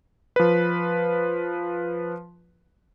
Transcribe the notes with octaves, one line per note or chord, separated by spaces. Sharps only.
F3 B4